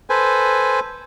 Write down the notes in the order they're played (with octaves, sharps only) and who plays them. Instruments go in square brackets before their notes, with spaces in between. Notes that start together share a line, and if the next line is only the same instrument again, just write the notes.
[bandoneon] A4 B4 C5 G#5